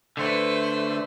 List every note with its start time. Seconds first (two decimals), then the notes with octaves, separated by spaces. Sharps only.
0.17 D3 A3 B4 C5